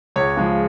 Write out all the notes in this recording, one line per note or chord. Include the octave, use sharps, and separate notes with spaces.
C#2 C#5
C#3 F3 G#3